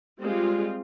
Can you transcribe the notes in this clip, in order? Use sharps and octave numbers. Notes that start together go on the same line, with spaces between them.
G3 G#3 C4 F4